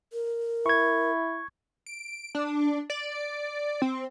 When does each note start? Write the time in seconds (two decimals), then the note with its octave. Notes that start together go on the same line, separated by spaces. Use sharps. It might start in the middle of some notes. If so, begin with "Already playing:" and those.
0.13 A#4
0.66 E4 C#6 G#6
1.86 D7
2.35 D4
2.90 D5
3.82 C4